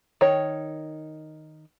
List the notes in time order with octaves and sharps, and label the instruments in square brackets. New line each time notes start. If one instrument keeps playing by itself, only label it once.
[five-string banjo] D#3 C#5